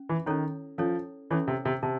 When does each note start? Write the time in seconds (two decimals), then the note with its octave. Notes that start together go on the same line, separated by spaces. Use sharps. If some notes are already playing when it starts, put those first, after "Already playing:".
Already playing: C#4
0.09 E3
0.26 D#3 C#4 E4 A4 C#5
0.78 F3 C#4 E4 A4 C#5
1.31 E3 C#4 E4 A4 C#5
1.48 C3
1.65 C3
1.83 C3 A5